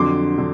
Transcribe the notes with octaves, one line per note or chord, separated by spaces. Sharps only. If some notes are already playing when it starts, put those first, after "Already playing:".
Already playing: F2 D3 F#3 C6 D6
D3 F#3